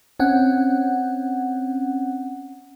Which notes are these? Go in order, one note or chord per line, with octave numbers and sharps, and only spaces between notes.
C4 C#4 F#5